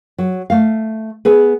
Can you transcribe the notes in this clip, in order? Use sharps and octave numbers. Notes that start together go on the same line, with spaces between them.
F#3
A3 F5
B3 G#4 B4